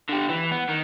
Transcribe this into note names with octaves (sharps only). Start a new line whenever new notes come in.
D3 G4
E3
B3
D#3